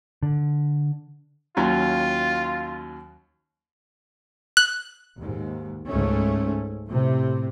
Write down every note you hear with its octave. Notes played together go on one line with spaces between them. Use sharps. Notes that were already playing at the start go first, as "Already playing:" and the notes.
D3
D#2 F#3 C#4 F4
F#6
D#2 G#2
C#2 G#2 A3 C#4
A2 C3